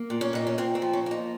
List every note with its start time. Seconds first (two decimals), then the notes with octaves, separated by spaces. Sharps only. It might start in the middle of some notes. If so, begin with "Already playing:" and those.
Already playing: A#3
0.10 A#2
0.21 C#4
0.33 A#2 D#4
0.47 C#4
0.58 A#2 C4
0.75 C4
0.82 F3
0.93 C#4
1.06 A#3 D#4